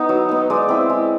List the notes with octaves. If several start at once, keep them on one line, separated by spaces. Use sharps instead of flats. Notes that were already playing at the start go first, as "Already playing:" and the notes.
Already playing: B3 D#4
F#3
B3 D#4
G#3 D5
C4 E4
G#3